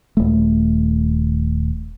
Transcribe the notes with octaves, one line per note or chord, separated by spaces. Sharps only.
D#1 A3